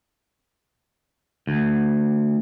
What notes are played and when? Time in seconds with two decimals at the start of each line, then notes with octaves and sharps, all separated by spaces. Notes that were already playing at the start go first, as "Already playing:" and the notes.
1.47 D2